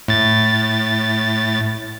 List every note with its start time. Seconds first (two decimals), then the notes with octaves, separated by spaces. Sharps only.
0.08 A2 A6